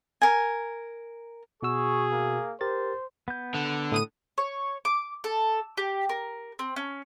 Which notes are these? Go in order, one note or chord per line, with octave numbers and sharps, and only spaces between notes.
A#4 G#5
B2 F#4 G#4 C#6 E6
A#3
G4 A#4 C5 A6
B3 G6
D3
A2 D#6 D#7
C#5
D6
A4
G4
A#4
C4
C#4